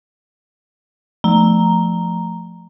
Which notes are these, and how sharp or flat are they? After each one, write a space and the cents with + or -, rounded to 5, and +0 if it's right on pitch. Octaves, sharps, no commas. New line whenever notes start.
F3 +0 A3 +0 A#5 +0